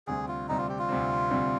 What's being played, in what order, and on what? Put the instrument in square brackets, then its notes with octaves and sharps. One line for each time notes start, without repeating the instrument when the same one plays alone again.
[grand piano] D2 C3 G3 C4 [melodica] G#4
[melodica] F4
[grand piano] D2 C3 G3 C4 [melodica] D#4
[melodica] F4
G4
F4
[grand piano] D2 C3 G3 C4
D2 C3 G3 C4